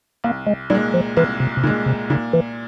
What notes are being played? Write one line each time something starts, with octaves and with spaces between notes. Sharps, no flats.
C2 A#3
G#3
A#2 G3 G#3
F3
C2 E3
C3
C3
A#2 C#3 G#3
C3
A#2 C#3
E3